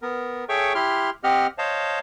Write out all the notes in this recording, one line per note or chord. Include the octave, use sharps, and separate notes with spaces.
B3 A#4
G#4 A4 C#5 E5 G5 C#6
E4 G4 C6 F6
C4 G4 D#5 F#5 F6
C5 C#5 D#5 F5 A5